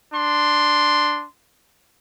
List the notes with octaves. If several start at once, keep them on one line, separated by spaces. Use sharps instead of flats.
D4 C6